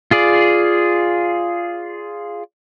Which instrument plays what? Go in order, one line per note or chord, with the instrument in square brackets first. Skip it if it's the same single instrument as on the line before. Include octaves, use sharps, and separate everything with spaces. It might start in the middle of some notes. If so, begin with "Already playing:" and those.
[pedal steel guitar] F4 G#4 D5